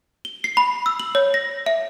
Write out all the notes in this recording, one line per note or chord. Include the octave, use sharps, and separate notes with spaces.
G7
C7
B5
E6
F#7
C#5
A#6
E5